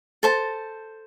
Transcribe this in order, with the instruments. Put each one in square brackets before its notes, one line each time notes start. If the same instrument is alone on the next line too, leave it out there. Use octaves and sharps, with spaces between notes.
[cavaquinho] A4 C5 A5